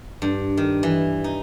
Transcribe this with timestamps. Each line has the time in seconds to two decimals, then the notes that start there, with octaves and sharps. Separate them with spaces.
0.22 G2
0.57 D#3
0.83 E3
1.24 D#4